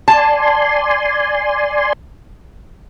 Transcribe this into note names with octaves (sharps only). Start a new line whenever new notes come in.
D5 G#5 A5 C6